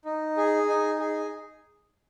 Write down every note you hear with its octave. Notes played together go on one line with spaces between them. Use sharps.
D#4
G#4
D#4
G#4